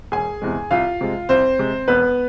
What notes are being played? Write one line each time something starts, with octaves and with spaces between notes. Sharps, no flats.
E1 G#4 G#5
E2 C3 G#3
C2 F4 F5
C3 G#3
C2 C4 C5
C3 G#3
E1 B3 B4